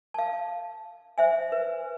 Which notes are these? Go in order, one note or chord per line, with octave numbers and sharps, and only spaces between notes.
F5 A5
C5 E5 G#5
B4